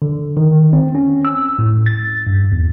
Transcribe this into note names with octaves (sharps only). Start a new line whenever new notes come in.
D3
D#3
C4
C#4
E6
A2
A6
G2
E2